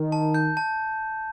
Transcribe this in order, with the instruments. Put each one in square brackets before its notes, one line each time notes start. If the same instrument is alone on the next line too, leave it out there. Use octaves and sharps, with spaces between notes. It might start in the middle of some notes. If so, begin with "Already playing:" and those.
Already playing: [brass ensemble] D#3
[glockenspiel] A5
G6
A5